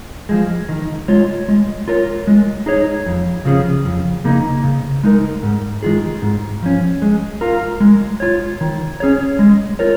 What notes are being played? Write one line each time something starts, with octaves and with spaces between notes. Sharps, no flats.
F3 G#3
D#3
G#3 F4 C#5
G#3
F4 A#4 C#5
G#3
D#4 G#4 C#5
F2
C#3 F3 C#4 G#4
F2
C#3 A#3 D#4
C#3
G#3 D#4 A#4
G#2
D#3 G#3 F4 G#4
G#2
F3 C#4
G#3
F4 A#4
G#3
F4 C#5
D#3
C#4 G#4 C#5
G#3
F4 A#4 C#5